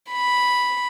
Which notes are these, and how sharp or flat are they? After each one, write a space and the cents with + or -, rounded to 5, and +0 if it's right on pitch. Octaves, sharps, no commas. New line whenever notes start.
B5 +0